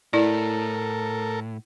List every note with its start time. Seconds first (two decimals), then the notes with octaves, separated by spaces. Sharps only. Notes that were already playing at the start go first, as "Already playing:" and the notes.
0.13 A2 E4 A4 A#4 D5